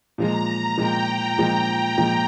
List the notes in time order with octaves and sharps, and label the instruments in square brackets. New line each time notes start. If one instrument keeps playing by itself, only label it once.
[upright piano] A#2 F3 G#3 [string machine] A#5
[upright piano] A#2 F3 G#3 [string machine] G5
[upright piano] A#2 F3 G#3
A#2 F3 G#3